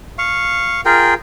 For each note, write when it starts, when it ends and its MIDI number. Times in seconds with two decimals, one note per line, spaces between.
0.18 0.81 77
0.18 0.81 85
0.85 1.14 65
0.85 1.14 68
0.85 1.14 70
0.85 1.14 79